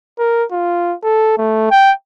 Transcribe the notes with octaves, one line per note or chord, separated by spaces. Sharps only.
A#4
F4
A4
A3
G5